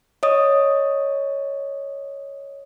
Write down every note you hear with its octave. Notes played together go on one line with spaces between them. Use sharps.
C#5 D#5 D#6